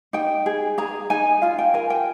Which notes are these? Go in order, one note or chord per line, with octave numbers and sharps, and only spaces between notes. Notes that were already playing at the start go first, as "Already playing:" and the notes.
D#4 G5
G#4
G#4 A#5
D#4 G#5
F4 F5
G5
A#4 G#5
G5